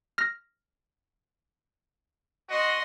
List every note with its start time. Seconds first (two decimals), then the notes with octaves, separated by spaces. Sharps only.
0.18 F6 A#6
2.49 F#4 D#5 C6